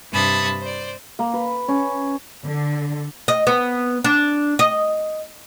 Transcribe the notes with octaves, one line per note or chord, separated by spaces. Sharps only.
G2 C3 A5 B5 D#6 G#6
C5 D5
A#3
B4
C#4
D3
D#5
B3
D4
D#5